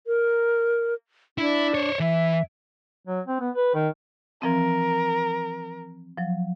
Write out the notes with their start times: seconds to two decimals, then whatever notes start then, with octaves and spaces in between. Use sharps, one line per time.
0.07 A#4
1.38 D4 E4
1.75 C5 C#5
2.00 E3 E5
3.06 F#3
3.27 C4
3.41 B3
3.56 B4
3.74 D#3
4.42 E3 F3 C4 A#4
6.18 F3 F#3